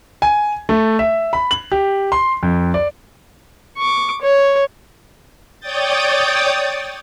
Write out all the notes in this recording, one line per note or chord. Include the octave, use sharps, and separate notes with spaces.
G#5
A3
E5
B5
F#7
G4
C6
F2
D5
C#6 D6
C#5
C#5 D5 G5 D#6 G6 A6